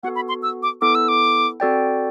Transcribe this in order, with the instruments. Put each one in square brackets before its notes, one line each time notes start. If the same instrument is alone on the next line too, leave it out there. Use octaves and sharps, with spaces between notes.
[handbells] B3 F#4 A4 [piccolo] F#5
[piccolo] B5
C6
E6
D6
[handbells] B3 E4 A4 [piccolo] D6
[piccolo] E6
D6
[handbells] C4 F#4 A4 D5 G5